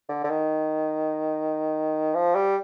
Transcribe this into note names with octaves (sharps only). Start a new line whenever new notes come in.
D3
D3
D#3
F3
G3